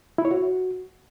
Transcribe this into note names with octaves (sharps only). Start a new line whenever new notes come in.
E4
C#5
F#4